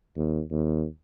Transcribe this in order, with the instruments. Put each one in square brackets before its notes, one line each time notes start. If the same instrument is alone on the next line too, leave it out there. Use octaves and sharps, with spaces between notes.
[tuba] D#2
D#2